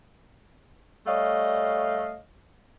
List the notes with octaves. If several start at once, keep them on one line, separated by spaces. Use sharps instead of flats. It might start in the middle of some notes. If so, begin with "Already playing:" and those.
G3 A3 C#5 D#5 F5